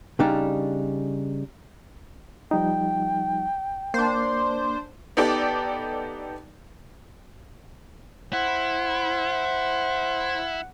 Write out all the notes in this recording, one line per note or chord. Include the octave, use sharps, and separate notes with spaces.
C#3 G3 D4 D#4
F3 G3 D#4 G5
A#3 D4 C5
B3 D#4 G4 A4 D5 G5
E4 C5 F#5